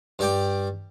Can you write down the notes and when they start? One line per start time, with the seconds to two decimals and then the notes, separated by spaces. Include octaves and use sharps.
0.19 G2 D5 G5 D6